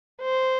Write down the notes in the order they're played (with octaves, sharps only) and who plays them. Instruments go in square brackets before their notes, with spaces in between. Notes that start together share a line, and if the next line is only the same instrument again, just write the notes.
[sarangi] C5